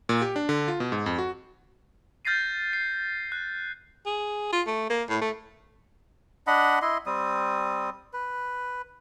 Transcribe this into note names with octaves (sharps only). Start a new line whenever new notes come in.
A#2
G4
D4
D3
F4
B2
G#2
F2
F#4
F6 G6 A6 A#6 C7 D#7
C7
F#6
G#4
F4
A3
A#3
A2
A3
D4 D#5 F#5 B5
E4 D#5 C6
G3 C4 D#6
B4